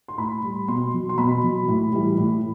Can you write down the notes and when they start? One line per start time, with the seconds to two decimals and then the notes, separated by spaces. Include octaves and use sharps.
0.08 C6
0.18 A2 B5
0.43 G3
0.68 B2 C6
0.94 F#3
1.09 C6
1.18 B2 B5
1.43 F#3
1.68 A2
1.93 E3 G3
2.18 A2